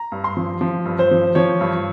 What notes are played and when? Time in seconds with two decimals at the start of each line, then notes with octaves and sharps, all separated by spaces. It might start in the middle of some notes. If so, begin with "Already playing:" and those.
Already playing: A#5
0.12 G2
0.24 C6
0.37 F3
0.61 F3
0.86 G2
0.99 C5
1.11 F3
1.35 F3 C#5
1.61 G2